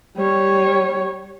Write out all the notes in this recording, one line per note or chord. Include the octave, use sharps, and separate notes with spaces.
G3 C#5